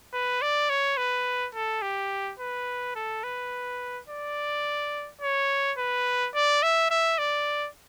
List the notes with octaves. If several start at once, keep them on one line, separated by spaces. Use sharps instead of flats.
B4
D5
C#5
B4
A4
G4
B4
A4
B4
D5
C#5
B4
D5
E5
E5
D5